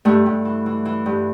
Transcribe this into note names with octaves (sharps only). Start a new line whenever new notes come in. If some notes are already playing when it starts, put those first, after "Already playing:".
G2 A3
G2
E3
E3
E3
G2